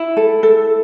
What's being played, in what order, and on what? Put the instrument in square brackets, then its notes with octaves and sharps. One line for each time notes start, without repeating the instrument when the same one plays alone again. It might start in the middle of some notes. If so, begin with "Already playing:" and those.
Already playing: [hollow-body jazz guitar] E4
[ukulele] A4
A4